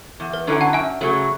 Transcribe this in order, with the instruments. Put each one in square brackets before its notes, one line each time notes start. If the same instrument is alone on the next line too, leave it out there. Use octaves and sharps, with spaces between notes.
[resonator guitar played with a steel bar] E2
[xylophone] B4
[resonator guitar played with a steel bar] D3 F#3 C#4 E4 [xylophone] G#5
[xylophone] F#5 A5
[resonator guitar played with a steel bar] F#2 [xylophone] E5 G#5
[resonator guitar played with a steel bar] C#3 F#3 A3